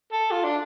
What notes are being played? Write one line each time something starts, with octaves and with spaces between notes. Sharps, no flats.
A4
F4
D4